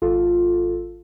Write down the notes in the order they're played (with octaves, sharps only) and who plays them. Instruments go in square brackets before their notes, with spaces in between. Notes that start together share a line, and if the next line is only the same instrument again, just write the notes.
[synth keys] G#1 F4 A4